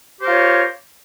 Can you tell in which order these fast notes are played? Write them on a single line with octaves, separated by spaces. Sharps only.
G4 C5 A#4 F4 C#5